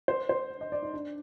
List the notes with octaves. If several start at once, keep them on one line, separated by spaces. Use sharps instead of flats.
C5
C5
D#5
D5
D#4
D4